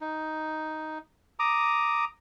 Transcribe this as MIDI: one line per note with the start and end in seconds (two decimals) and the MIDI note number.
0.01 0.98 63
1.39 2.05 82
1.39 2.05 86
1.39 2.05 87